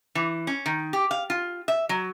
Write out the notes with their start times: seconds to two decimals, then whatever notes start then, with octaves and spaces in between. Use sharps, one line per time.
0.15 E3
0.47 C#4
0.66 D#3
0.93 G4
1.11 F5
1.30 F4
1.68 E5
1.89 F#3